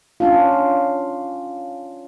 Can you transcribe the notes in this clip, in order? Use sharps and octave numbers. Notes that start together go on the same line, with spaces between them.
C#4 D4 F4